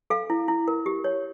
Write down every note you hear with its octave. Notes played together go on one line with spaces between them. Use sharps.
A4 F5
E4
E4
A#4
G4
C#5